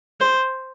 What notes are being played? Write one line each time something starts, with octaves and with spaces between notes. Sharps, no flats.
C5